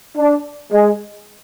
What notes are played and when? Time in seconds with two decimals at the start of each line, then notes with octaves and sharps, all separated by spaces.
0.16 D4
0.72 G#3